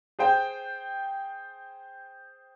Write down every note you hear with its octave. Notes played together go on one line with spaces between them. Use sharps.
G#4 C5 G5